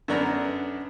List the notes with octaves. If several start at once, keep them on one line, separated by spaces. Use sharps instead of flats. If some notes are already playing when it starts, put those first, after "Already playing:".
F#2 D3 B3 D4 A#5